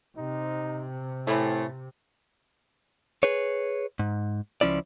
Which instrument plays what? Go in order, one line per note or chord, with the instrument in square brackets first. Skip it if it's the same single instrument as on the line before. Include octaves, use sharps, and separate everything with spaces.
[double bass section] C3 [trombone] D#4
[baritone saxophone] A2 [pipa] E3 A3 [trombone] C4
[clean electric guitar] G#4 B4 C#5
G#2
C#2 F3 C#4 E4 D5